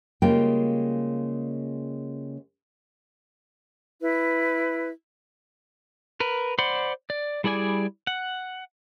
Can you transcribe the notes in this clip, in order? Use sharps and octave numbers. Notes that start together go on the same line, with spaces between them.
C#3 G3 G#3 A#3 F4 G5
E4 B4
A#4 B4
C5 D5 F#5 B5 C6
D5
G3 E4 G#4 D5 G#5
F#5